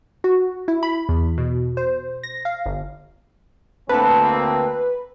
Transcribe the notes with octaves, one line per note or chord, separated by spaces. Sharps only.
F#4
E4
B5
E2
B2
C5
A#6
F5
G1
D2 A#3 C4 A4 B4 A5